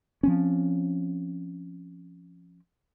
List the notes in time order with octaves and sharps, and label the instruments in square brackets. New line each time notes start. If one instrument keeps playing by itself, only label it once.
[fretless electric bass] F3 C4 C#4